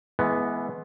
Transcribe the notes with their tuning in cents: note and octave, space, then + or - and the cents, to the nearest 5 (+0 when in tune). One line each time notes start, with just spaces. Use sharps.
E3 +5 G#3 +30 B3 +0